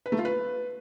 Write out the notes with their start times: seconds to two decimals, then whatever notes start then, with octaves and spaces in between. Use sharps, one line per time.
0.06 B4
0.12 A3
0.18 F4
0.25 B4